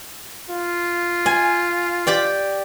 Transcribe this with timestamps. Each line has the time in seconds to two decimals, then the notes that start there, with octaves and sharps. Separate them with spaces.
0.50 F4
1.26 G#5
2.07 G4 D5 G5